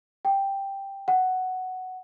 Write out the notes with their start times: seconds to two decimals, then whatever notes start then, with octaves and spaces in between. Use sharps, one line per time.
0.25 G5
1.08 F#5